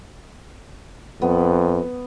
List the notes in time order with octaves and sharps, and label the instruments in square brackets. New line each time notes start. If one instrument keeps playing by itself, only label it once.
[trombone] F2 [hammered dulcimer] B3